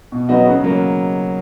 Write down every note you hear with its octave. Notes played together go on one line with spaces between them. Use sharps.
B2
F#3 B3 D#4 F#4
C#3
F#3 A#3